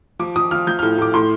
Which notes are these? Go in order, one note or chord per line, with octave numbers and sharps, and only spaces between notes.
F3 D6
F3 D#6
F3 F6
F3 G6
A2 F6
A2 D6
A2 C6